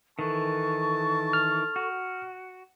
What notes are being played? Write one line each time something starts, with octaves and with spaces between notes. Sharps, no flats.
D#3 E3 A4 A5 C#6
F6
F#4